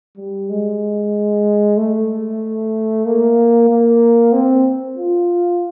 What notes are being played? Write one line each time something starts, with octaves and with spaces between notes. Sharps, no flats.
G3
G#3
A3
A#3
A#3
C4
F4